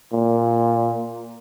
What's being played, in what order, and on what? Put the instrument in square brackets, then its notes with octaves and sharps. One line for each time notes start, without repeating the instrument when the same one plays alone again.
[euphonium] A#2